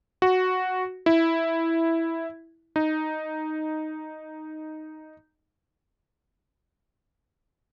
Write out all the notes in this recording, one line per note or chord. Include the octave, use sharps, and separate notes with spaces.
F#4
E4
D#4